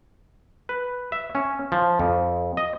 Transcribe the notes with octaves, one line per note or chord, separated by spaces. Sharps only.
B4
E5
C#4
F3
F2
D#5